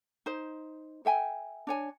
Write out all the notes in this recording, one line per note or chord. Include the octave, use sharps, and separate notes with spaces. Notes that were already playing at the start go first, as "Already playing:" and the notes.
D#4 C5
A4 E5 G5 G#5
D4 C#5 G#5